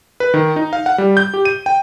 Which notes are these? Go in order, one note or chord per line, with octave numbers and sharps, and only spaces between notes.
B4
D#3
D#4
F5
F#5
G3
G6
G4
D#7
G5